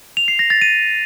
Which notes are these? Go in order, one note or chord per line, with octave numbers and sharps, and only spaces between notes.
F7
C7
A#6
A6
D#7